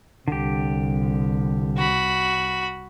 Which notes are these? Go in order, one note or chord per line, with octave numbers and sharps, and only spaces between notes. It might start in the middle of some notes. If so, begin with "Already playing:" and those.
C2 D3 G4
F#4 B5